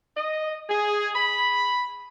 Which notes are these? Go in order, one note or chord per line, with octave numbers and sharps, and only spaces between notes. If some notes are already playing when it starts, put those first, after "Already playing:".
D#5
G#4
B5